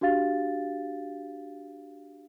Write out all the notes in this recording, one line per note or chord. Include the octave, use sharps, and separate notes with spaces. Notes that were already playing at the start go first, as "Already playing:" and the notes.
D4 F#4 G4 F5 A6